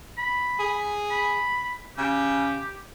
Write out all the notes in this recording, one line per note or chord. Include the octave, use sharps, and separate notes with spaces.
B5
G#4
B5
C#3 G4